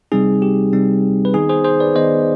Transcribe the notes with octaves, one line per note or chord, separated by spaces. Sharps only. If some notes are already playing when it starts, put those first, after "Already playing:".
C3 G3 C4 D#4 G#4
G4
C3 G3 C4 D#4
B4
D#3 B3 D#4 G#4
G#4 C5
G#4 C5
B4 D5
D#3 B3 D#4 C5 D#5